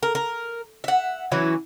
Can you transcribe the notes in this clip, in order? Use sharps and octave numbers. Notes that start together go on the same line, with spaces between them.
A#4
A#4
E5 F#5
E3 F#3 C#4 E4